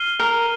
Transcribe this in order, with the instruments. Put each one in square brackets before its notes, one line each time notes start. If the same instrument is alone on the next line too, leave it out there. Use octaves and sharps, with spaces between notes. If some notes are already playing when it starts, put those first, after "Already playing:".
Already playing: [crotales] F6 C7 D#7 G7
[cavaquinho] A#4